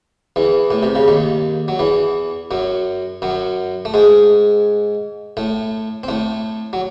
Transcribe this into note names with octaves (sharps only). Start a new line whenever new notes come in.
E2 E3
A2
C3
C#3
D#2 D#3
F#3
E2 E3
F#2 F#3
F#2 F#3
A3
G#2 G#3
A2 A3
C4
A2 A3
F#3